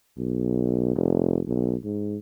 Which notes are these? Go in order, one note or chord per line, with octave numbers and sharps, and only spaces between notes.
B1
F1
B1
G#2